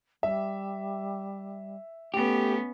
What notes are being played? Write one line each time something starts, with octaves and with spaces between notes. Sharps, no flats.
G3 E5
A3 B3 C#4 G4